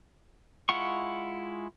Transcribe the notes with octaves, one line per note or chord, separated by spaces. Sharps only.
G#3 E4 F4 F#5 C#6